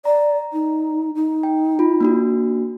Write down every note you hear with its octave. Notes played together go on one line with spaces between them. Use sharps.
D5 A#5
D#4
D#4
G5
F4 B5
A#3 D4 F#4